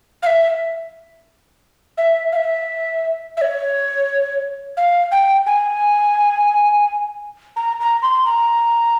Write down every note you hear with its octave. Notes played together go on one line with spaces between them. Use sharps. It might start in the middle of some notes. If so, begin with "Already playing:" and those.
F5
E5
E5
F5
E5
E5
C#5
F5
G5
G#5
A#5
A#5
C6
A#5